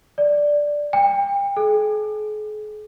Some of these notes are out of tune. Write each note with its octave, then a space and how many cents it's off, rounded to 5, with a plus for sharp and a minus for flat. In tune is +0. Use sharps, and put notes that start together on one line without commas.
D5 +0
G5 +35
G#4 +45